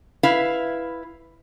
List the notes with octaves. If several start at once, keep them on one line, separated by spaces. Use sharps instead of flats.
E4 B4 F5